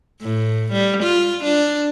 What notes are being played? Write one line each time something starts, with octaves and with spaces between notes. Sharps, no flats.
A2
G3
F4
D4